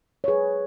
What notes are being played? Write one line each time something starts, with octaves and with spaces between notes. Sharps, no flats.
C#5
F#3 G#4 B4